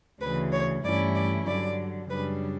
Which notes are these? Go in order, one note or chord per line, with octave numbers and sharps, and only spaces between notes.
D2 C#3 E3 B4
C#5
G2 E3 A3 C#4 E4 D5
D5
G2 D3 F#3 D5
F#2 C#3 G3 D4 B4